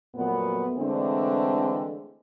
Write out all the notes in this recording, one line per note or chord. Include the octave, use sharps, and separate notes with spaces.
F2 A#2 F#3 A3 B3
D3 E3 G#3 A3 C4 D4